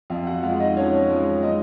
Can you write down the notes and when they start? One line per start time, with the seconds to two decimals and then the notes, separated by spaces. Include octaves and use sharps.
0.10 F2 F4 F5
0.27 F#4 F#5
0.43 G#3 F4 F5
0.60 D#4 D#5
0.77 F3 C#4 C#5
1.10 G#3
1.43 G#3 D#4 D#5